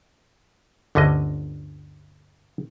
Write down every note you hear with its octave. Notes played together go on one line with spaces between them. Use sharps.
G1 D2 D3 C#4 D#5